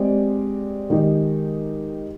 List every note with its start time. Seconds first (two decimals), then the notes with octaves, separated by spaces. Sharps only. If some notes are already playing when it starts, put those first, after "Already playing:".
Already playing: G#3 C4 G4 D5
0.90 D#3 G#3 D#4 G4